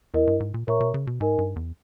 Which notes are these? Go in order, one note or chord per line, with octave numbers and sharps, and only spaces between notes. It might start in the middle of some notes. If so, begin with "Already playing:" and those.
E2 E4 A#4 D#5
G2
G#2
A#2
A#2 A#4 C#5 E5 A#5 C#6
B2
C#3
B2
G#2 D#4 A#4 D#5 G#5
G2
E2